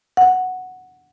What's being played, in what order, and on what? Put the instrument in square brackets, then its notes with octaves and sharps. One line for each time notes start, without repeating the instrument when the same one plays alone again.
[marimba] F#5